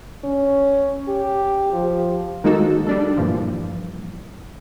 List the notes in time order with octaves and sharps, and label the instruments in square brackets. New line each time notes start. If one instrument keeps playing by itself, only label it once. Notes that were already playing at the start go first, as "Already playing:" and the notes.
[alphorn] C#4
G4
F3
[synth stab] D#3 G#3 A#3 D#4 F#4 A4
G3 D4 A4
G2 A#2 E3 F3